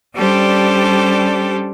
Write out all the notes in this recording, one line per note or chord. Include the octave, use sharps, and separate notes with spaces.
G3 C#4 D4 G4 A4 C5